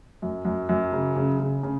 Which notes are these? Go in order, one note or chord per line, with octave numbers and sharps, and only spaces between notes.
F#2
F#2
F#2
C#3
C#3
C#3
C#3